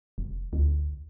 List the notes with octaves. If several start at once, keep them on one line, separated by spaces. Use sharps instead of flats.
F1
D2